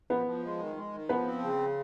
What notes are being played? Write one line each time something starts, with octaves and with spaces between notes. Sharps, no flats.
F3 B3 B4
F3
G#3
D#3
G#3
D#3
F3 B3 B4
C4
C#3